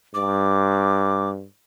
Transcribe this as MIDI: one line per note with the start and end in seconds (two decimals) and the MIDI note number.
0.14 1.45 43
0.14 1.29 86